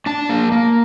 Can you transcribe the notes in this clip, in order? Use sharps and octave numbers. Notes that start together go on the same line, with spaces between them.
D4 A5
A#3
A#3